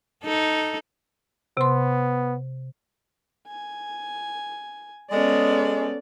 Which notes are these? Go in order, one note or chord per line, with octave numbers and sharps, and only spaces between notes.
D#4 A4
C3 B3 C6
G#5
G#3 B3 C#4 A4 D5